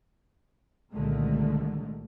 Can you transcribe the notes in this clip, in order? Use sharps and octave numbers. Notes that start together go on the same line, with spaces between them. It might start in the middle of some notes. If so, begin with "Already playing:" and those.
C2 A#2 D3 D#3 G#3 A3